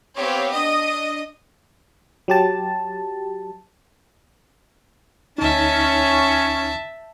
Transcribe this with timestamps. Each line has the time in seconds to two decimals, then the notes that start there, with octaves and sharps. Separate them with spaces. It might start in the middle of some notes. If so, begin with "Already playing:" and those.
0.16 B3 C4 G4 C#5 F5
0.52 D4 D#5 D#6
2.28 F#3 G4 A5
5.38 D2 C#4 D#4 E5 A5